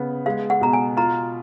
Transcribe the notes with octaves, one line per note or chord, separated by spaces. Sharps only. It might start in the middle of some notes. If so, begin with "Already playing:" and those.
Already playing: C#3 B3
G#3 F5
F#5
B2 A#5
G#5
F4 A#5